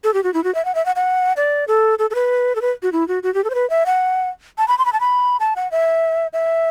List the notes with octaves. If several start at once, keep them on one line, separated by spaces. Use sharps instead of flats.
A4
G4
F#4
E4
F#4
E5
F#5
E5
F#5
F#5
D5
A4
A4
A4
B4
A4
B4
F#4
E4
F#4
F#4
G4
A4
C5
B4
E5
F#5
A5
B5
C6
B5
A5
B5
A5
F#5
E5
E5